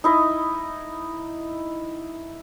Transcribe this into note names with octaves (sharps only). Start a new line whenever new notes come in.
D#4 E4 D#5